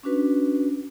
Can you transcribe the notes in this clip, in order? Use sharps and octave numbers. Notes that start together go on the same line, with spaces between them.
C#4 D4 F#4 B4